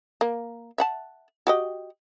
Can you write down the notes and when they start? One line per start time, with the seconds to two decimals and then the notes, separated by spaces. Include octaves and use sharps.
0.21 A#3
0.78 E5 F#5 A5
1.47 F#4 G4 D#5